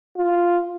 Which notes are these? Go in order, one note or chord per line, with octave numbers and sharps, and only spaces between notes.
F4